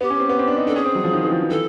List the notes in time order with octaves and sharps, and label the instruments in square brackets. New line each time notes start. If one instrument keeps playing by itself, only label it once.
[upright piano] B3 [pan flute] G4
[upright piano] C#4
C4
B3
C4
D4
D#4
[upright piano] D4 [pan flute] A4
[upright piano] C#4 [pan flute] G#4
[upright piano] C4
F#3
F3
D#3
E3
F3
D#3
[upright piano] E3 [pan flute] A4